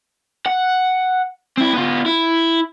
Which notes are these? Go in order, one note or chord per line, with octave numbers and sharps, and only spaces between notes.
F#5
C4 E4
B3 F4
E4